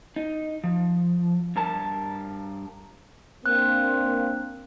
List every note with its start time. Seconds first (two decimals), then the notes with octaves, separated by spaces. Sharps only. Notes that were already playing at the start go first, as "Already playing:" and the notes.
0.16 D#4
0.64 F3
1.56 G2 A#4 A5
3.46 A#3 C4 D4 F#6